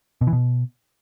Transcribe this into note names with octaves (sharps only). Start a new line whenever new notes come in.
B2
E3
B2